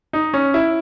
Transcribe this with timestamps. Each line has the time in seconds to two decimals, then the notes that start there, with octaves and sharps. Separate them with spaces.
0.13 D#4
0.34 C#4
0.54 E4